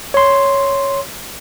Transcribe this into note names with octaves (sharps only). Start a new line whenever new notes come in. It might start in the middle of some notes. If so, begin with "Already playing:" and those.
C#5 C6